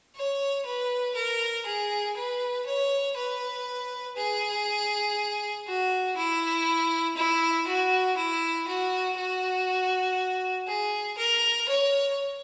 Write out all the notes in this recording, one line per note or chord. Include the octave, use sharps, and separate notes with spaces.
C#5
B4
A#4
G#4
B4
C#5
B4
G#4
F#4
E4
E4
F#4
E4
F#4
F#4
G#4
A#4
C#5